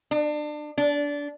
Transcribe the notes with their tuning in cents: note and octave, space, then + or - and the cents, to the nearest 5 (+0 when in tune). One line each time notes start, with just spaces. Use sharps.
D4 +30
D4 -20